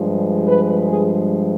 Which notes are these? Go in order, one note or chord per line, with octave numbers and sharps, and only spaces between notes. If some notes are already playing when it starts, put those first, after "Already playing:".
Already playing: G2 F3 G#3
B4
G#4